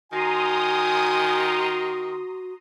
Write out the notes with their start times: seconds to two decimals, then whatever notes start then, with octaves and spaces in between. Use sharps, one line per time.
0.12 D#3 F#4 G#5 A#5 C6 D#6